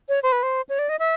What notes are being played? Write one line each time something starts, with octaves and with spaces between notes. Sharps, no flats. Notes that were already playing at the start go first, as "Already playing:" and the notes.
C#5
C5
B4
C5
C#5
D5
D#5
E5